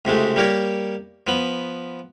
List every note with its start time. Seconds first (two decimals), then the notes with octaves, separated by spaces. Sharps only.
0.05 C#2 C3 G#3 A3
0.36 G3 A#3 G4 A#4 C#5
1.27 F3 B3 B5